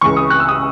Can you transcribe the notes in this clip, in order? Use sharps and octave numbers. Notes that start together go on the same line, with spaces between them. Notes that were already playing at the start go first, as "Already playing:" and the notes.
C#2 C#3 E3 C#6
D#6
F#6
E6
D#6